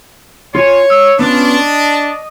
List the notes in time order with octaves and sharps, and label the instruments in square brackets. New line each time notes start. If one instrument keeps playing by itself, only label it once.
[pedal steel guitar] F4 G#5 [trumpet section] C#5
[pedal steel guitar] E6
[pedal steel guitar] B3 C#4 F4 [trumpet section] D4
[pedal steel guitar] D#5